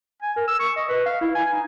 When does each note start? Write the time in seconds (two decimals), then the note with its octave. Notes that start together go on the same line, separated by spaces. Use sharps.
0.22 G#5
0.36 A#4
0.48 E6
0.60 C#6
0.76 D#5
0.89 B4
1.06 F5
1.21 E4
1.35 G#5
1.53 D#4